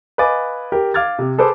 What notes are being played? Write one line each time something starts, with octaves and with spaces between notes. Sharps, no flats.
B4 D#5 F5 G#5 D6 A6
G4 A#4
F5 D6 F6 G#6 A6
C3
G#4 A4 B4 C5 D6